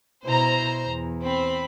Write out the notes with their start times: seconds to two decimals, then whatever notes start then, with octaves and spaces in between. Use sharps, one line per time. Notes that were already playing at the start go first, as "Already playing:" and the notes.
0.25 B2 E4 C5 A#5
0.88 E2
1.22 C4 B5